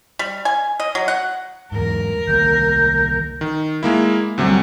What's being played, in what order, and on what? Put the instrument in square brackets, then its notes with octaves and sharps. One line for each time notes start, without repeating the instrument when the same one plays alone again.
[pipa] G3
G#5
D#5
F#3
F#5
[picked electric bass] E2 G#2 [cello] A#4
[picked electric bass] C2 D#3 A#3 [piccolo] G6
[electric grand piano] D#3
G#3 A#3 E4
D2 C3 F#3 G3